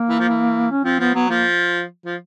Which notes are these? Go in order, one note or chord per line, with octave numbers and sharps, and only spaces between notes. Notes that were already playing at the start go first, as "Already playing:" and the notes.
Already playing: A#3
E3
F3
E3
C#4
F3 C4
F3 B3
F#3 B3
F3 A#3
F3